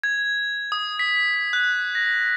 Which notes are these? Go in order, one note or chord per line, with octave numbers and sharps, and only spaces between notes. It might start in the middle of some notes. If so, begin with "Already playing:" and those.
G#6
D#6
B6
F#6
A#6